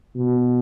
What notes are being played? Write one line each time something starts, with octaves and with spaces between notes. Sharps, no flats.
B2